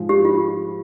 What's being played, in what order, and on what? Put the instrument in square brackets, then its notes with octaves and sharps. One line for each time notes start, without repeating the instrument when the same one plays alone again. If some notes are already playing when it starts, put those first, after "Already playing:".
Already playing: [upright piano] G#2 F3 G#3
[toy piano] G4
F4